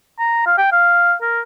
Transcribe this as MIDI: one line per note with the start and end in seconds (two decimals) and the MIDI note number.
0.19 0.42 82
0.46 0.55 77
0.58 0.70 79
0.72 1.14 77
1.22 1.40 70